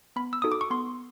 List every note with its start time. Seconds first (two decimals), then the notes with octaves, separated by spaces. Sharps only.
0.16 B3 B5
0.33 E6
0.42 D#4 F#4 A4 D#6
0.52 D6
0.61 C#6
0.70 B3 C6